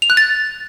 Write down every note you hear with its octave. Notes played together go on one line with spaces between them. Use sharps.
F7
F#6
A6